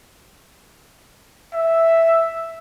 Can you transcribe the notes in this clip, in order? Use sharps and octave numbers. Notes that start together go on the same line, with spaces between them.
E5